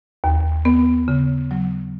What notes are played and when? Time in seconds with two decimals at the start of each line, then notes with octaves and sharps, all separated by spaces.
0.24 D#2
0.65 B3
1.08 C#3
1.51 F#3